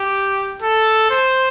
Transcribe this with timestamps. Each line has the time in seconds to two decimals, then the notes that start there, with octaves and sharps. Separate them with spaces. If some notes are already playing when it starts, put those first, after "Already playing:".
Already playing: G4
0.62 A4
1.10 C5